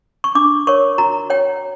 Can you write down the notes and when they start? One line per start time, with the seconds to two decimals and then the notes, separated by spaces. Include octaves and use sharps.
0.24 C#6
0.35 D4 D6
0.67 A#4 C#5 C#6
0.98 F#4 A#5
1.30 C#5 G5